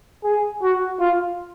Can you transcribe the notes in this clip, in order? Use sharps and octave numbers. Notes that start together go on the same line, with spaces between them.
G#4
F#4
F4